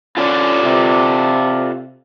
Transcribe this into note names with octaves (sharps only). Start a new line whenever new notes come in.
C#4 F4 A4 D5
C3